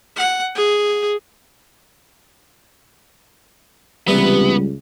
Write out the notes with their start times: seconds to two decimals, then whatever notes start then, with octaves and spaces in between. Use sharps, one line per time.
0.16 F#5
0.55 G#4
4.08 C#2 C3 E3 G3 B3